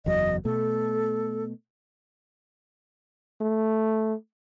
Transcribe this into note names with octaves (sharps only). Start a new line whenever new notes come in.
F#1 E2 F#3 D#5
B2 A3 A4
A3